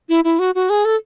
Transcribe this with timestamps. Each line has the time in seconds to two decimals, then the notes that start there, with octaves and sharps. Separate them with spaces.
0.09 E4
0.24 E4
0.39 F#4
0.55 F#4
0.70 G#4
0.85 A4